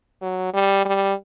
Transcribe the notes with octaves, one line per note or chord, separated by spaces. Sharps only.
F#3
G3
G3